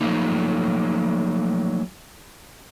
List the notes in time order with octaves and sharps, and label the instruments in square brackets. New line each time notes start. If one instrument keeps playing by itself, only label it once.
[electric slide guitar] F3 F#3 A3 A#3 D#4